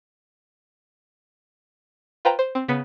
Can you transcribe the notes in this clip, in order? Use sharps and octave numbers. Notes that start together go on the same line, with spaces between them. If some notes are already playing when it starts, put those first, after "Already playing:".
F4 B4 C5 G5 A#5
C5
C4
C#3 B3 B6 C#7